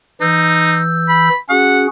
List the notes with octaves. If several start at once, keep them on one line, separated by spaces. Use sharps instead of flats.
E3 D#4 E6 G6
B5
C#4 F#4 G#4 F#5